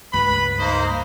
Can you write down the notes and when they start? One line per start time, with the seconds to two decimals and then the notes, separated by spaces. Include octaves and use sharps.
0.13 C#2 G2 B4 B5
0.59 A#3 D#4 C5